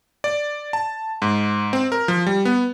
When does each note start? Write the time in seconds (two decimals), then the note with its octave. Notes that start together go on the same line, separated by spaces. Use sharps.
0.24 D5
0.73 A5
1.22 G#2
1.73 C4
1.92 A#4
2.08 F3
2.26 G3
2.45 B3